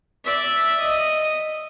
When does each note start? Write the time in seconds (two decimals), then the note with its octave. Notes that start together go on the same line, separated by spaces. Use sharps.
0.24 D5 E5
0.79 D#5